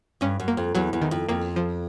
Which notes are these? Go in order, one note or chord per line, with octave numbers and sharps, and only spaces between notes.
G2 C#4
F#2
A#3
F2
E2 F#3
E2
D#3
F2
F2 A#3
F3